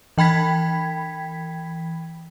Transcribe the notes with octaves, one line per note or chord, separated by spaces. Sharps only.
E3 G5 B5 G#6 B6